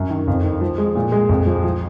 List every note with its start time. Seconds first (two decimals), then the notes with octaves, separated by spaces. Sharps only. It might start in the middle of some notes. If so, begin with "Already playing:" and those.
Already playing: F#2
0.10 D#3
0.27 F2
0.44 D#3
0.61 F3
0.78 G#3
0.96 A#2
1.12 G#3
1.29 F2
1.46 F3
1.64 F3